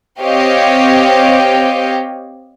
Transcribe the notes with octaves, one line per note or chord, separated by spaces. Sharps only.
C4 G4 C#5 D#5 F5 G5